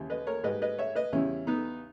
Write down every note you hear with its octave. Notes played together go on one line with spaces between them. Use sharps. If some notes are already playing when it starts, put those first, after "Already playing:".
Already playing: D#2 C#3 E3 G3
B4 D#5
A#4 C#5
G#2 G3 B4 D#5
B4 D#5
C#5 E5
B4 D#5
E2 C#3 G3 C#4 E4
B3 D#4